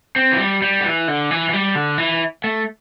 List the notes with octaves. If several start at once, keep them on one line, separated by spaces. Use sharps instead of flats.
C4
E3
G3
G3
D3
E3
D3
E3
E3
G3
D3
E3
A3